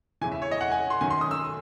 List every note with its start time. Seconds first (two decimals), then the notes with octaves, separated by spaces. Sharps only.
0.21 E2 C#3 E3 G#5
0.32 E5
0.42 C#5
0.51 D#5
0.61 F#5
0.71 G#5
0.90 C6
1.01 F#2 D#3 F#3 G#5
1.10 C6
1.21 D#6
1.31 E6